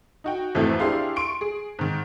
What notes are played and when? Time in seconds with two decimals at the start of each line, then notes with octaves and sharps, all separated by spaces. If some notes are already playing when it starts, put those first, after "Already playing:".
0.24 D#4 F#4 G5
0.55 G#1 F2 E3 A3 E4 A4
0.79 D4 E4 G4 G#4 F5 C6
1.16 C6 C#6 D7
1.41 G#4
1.79 G#2 D#3